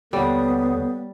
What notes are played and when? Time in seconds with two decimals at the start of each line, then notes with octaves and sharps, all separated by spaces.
0.13 D#2 D3 G3 B3 A4 C#5 F#5